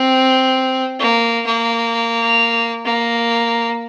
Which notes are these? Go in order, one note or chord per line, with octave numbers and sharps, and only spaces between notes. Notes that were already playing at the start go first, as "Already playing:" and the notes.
Already playing: C4
A#3
A#3
A#3